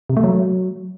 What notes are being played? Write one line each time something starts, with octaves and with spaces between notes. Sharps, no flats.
C3
A3
F#3